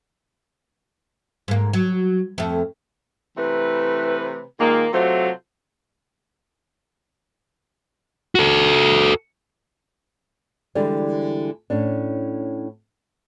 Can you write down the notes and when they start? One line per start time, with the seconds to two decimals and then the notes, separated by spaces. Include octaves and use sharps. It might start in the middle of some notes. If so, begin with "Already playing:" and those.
1.48 G#2 A#3
1.73 F#3
2.38 F2 A3
3.38 C3 E3 A3 B4
4.60 A#2 D#3 G#3 A#3
4.93 C3 F#3 A3 F4 A4 C5
8.35 F#4 A4
10.75 D3 E3 G3 G#3
11.70 A2 C#4 D4